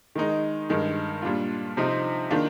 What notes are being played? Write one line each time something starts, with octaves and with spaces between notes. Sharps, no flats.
D#3 G#3 D#4
G2 D#3 G#3
A#2 G3 D4 F4
C3 F3 C4 D#4
D#3 A#3 D4 F4